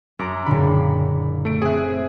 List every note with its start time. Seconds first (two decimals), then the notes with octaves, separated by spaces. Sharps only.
0.19 F#2 A#5 D6
0.46 F#1 A#2 D3 B5
1.45 A3 D7
1.62 C4 G#4 E5 F#6